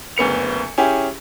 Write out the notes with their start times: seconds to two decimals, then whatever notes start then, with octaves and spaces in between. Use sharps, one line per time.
0.17 F#1 D2 B3 C#7 F7
0.78 C#4 E4 G4 G#4